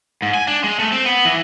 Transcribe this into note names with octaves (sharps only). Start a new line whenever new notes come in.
G#2
G#5
D4
G#3
A3
C4
B3
E3